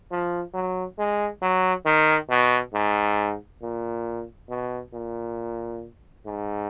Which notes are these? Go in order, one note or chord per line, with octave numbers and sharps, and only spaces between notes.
F3
F#3
G#3
F#3
D#3
B2
G#2
A#2
B2
A#2
G#2